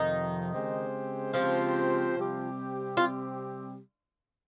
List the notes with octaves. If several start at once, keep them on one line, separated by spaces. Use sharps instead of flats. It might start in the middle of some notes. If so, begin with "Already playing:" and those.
Already playing: F2 C3 D#3 F3 D#4
C#3 G#3 C4 G4 C5
C#3 F3 G#3 C4 F4 G4 C5
C3 G3 C4 G4
C3 G3 C4 F4 G4